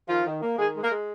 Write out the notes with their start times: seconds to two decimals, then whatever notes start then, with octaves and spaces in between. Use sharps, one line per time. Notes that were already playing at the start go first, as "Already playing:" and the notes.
0.09 D#3 F3 F4
0.26 D#3
0.42 A#3
0.58 D#3 G#3 G#4
0.75 G#3
0.83 A#3 A#4
0.91 G#3